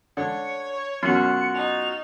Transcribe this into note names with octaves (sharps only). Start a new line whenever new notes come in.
D3 C#5 C#7
C#6
F#2 B2 F4 F#4 C#7
D#4 F7